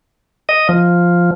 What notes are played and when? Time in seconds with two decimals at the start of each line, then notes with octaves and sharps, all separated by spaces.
0.49 D#5
0.69 F3